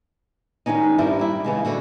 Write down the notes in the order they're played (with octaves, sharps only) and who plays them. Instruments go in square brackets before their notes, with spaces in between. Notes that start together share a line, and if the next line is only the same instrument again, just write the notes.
[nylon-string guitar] D#3 F#3 G3 C#4 D#4
G2 G3 C4 E4 A#4
G3 E4
C#3 E3 G#3
G2 D3 F#4